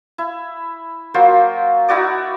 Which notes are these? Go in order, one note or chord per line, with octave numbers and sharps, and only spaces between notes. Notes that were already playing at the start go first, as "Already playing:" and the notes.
E4
F#3 A#3 F4 C5
D#4 E4 F#4 D5